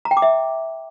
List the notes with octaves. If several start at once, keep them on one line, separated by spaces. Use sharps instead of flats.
A#5
G5
D6
E5